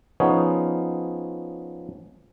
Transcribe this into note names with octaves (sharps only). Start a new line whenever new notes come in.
F3 B3 C#4 D#4 G#4 C#5